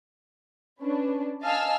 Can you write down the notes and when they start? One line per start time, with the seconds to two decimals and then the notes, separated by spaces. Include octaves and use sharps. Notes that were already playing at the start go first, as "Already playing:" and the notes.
0.81 C#4 D4 B4
1.42 D#5 F5 G#5 A5 E6 F6